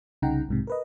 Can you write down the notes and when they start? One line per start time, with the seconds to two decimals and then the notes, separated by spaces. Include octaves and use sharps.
0.22 C2 C#3 D#4 F#5 G5 A#5
0.49 B1 G#2 C3
0.67 A#4 B4 D#5